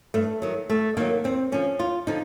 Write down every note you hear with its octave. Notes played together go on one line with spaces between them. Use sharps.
G2 A3
D#3 F#3
G2 A3
D#3 F#3 A#3
D#2 C4
D3 F3 C#4
D#2 F4
D3 F3 D#4